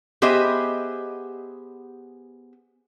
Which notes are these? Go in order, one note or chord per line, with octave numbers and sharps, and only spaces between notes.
B3 G4 G#4 C5 D#5 E5